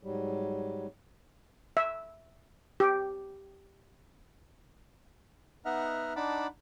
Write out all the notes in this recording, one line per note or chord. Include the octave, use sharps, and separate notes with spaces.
G#2 F#3 G3
E5
G4
B3 D#4 D#5 E5 F#5 F6
D4 D#4 F#5 A5 B5 D6